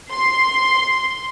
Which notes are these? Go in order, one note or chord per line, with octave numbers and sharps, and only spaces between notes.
C6